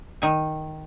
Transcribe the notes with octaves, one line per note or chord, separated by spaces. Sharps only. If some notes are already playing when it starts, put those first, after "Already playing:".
D#3 G#5